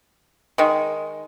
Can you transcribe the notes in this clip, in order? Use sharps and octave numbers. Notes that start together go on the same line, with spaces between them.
D#3 G#3